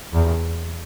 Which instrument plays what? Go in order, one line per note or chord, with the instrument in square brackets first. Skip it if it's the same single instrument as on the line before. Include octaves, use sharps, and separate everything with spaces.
[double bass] E2